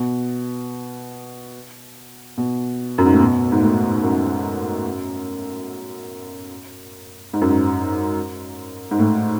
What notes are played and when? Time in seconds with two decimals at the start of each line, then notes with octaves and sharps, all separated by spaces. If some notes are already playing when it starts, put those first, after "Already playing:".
Already playing: B2
2.38 B2
2.98 F#2
3.05 G#2
3.13 A2
3.20 B2
3.52 G#2
3.61 A2
4.03 F#2
7.33 G#2
7.42 F#2
7.49 G#2
8.91 G#2
8.99 A2